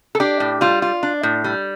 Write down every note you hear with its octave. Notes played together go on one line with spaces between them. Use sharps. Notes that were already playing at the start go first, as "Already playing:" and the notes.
A4
D4 G4
A2
G3 F4
F4
D4
A2
G3